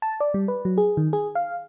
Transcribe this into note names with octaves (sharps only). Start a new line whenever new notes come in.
A5
D5
G3
B4
F#3
G#4
D#3
G#4
F5